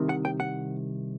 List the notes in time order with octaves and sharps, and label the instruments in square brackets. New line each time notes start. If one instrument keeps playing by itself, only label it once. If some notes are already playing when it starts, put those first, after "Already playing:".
Already playing: [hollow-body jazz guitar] C2 C3 D#3
F#5
G5
F#5